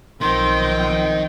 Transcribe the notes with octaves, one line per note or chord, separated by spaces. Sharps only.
B1 D#3 F3 C4 G5 C6